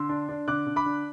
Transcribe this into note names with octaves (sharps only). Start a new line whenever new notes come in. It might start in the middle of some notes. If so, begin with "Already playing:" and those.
Already playing: D3 C6 E6
D4
D4
D3 D6 F#6
D3
B5 D6
D4